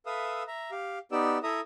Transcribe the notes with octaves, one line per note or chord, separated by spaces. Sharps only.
A4 B4 E5 F5 D#6 E6
E5 A#5
G4 F5
B3 D#4 G4 D5 E6
E4 A4 E5 A#5 D#6